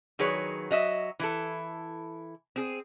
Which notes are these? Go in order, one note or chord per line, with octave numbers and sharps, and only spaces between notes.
D#3 F#3 G#4 B4 C#5
F#3 D#5 E5
E3 E4 A4
C4 G#4